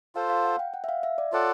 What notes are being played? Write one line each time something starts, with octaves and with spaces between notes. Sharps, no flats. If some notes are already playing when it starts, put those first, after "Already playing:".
F4 A4 C5 F5
F5
F#5
G5
F#5
E5
F5
E5
D5
F4 A4 C#5 D5 F#5